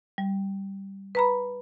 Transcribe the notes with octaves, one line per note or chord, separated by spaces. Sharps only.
G3
B4 A#5 B5